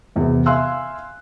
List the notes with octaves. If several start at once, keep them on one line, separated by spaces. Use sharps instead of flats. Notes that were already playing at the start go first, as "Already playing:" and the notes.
E1 E2 C3
E5 F5 G#5 C6 E6 F#6